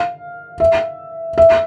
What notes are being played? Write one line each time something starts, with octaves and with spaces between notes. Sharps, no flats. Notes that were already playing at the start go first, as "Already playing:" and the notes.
Already playing: F5
E5
E5